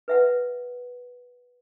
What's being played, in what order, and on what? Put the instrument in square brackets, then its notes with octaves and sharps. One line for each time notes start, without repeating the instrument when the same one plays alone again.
[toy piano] B4 E5 F#5